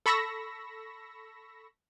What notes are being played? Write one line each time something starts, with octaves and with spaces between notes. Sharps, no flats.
A4 B5 C#6 E6 A#6